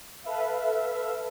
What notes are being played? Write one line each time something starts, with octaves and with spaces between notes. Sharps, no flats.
A4 B4 E5 F5